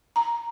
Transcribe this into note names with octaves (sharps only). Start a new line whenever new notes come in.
A#5